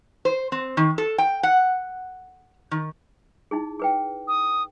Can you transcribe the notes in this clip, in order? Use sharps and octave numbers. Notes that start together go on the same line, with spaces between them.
C5
C4
D#3
A4
G5
F#5
D#3
D#4 E4 G#4
G#4 B4 G5
D#6